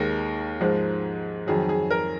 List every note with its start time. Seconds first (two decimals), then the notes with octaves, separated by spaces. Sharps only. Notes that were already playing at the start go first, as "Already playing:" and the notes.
Already playing: D#2 D#3 G#3 A#4
0.60 G#2 F3 G#3
1.47 F2 D#3 F#3 G#4
1.69 G#4
1.91 A#4